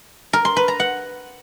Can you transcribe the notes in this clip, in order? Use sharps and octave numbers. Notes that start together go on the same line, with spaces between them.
A#4
C6
B4
A#5
F#5